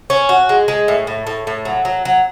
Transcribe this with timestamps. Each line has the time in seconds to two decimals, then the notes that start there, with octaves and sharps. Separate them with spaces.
0.10 C#4
0.29 F#4
0.49 G#3
0.68 G#3
0.88 A2
1.07 A2
1.27 A2
1.47 A2
1.65 F#3
1.85 F#3
2.05 F#3